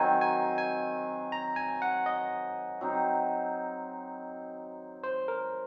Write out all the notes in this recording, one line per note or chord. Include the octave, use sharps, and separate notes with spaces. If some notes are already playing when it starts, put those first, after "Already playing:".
Already playing: D#3 F#3 C4 G#5
G#5
G#5
A#5
G#5
F#5
D#5
F#3 C4 D#4
C5
A#4